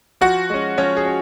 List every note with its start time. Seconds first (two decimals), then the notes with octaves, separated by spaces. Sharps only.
0.21 F3 F#4 F#5
0.50 G#3 C#4
0.78 F3 C#4 C#5
0.97 G#4
1.06 C#4